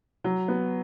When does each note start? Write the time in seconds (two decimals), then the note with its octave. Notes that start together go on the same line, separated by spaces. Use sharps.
0.24 F#3
0.48 B3